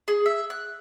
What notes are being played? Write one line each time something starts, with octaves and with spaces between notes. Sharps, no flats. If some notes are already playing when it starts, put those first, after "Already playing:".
G#4
E5
F#6